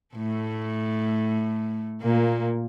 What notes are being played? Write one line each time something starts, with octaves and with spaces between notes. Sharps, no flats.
A2 A3
A#2 A#3